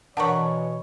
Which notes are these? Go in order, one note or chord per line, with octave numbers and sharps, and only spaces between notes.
B2 E3 D4 A#4 B4 C#5 F#5 C#6